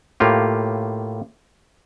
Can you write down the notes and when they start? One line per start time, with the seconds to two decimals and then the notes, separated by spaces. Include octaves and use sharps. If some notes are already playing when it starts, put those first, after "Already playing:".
0.20 A2 A#3 F4 G4